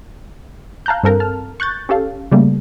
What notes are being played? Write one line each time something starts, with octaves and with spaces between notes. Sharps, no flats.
F5 A5 A#5 F#6 G6
G2 C4 A4 A#4
A5 F6
C#6 F#6 G6 A6
C#4 G4 A4 F5
C#3 G3 A3 A#3